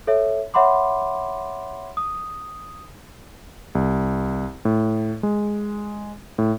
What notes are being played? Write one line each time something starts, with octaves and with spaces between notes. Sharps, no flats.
A4 C#5 E5
C#5 E5 F#5 B5 C6 D6
D#6
C2
A2
G#3
A2